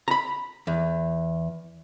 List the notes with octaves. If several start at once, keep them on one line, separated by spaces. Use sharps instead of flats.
A#5 B5
E2